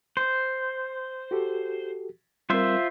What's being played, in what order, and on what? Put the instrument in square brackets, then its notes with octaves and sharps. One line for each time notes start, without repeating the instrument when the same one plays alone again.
[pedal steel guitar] C5
[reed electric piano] F#4 G4 A4
[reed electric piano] G3 C4 A#4 [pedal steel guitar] F4 C5 E5